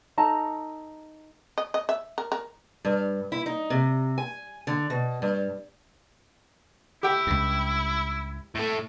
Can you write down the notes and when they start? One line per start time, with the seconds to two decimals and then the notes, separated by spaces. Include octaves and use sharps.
0.18 D#4 A4 A5 A#5
1.58 D#5
1.74 D#5
1.89 E5
2.18 A#4
2.32 A#4
2.85 G2
3.32 E4
3.46 D#4
3.70 C3
4.18 G#5
4.67 D3
4.90 B2
5.22 G2
7.03 E4 G4 G5
7.27 C#2 G2
8.55 A2 A3